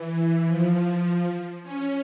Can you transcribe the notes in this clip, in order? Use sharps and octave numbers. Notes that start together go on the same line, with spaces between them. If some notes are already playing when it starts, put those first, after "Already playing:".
Already playing: E3
F3
C#4